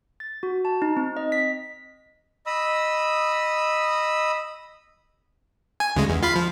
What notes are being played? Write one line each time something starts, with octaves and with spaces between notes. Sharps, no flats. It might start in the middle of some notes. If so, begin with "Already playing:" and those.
A6
F#4
A5
D#4
C4
D#5
B6
D#5 B5 D#6 E6
G#5
D2 C#3 G#3
E2
F4 F5 B5
F3